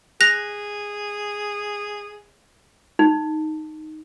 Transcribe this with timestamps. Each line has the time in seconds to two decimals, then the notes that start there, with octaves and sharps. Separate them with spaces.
0.21 G#4 F#6 A#6 F7
2.99 D#4